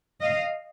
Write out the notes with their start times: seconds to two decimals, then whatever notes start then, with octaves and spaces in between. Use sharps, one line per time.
0.21 D#5 F5